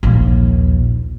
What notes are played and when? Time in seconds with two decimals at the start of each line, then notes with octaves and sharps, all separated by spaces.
0.03 A#1 D#2